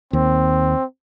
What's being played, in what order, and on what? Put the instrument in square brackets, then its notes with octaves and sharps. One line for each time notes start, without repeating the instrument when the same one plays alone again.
[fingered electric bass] D#2 [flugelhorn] C4